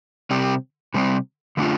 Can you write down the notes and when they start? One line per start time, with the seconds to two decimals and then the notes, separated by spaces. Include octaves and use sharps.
0.31 C3 G3 C4
0.94 C3 G3 C4
1.57 D3 A3 D4 F4